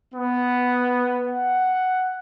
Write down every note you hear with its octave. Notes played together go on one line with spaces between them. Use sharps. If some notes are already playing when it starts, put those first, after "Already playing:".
B3
F#5